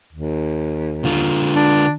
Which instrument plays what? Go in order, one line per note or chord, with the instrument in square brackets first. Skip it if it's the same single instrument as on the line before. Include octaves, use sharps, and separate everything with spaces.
[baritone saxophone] D#2
[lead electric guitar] D3 F4
[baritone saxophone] D4